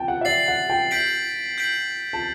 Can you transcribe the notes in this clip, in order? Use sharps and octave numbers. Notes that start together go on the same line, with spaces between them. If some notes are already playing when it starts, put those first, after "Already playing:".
Already playing: G5 A5
F#5
E5
D5 A6 C7 F#7
F#5
G5
G6 B6 D7 F#7
G6 B6 D7 F#7
A5